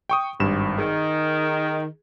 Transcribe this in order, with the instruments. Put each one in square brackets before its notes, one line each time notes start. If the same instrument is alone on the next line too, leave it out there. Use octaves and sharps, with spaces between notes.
[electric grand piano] G5 C#6 D#6
G#1 G2 E7
[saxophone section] D#3 [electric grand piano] G#4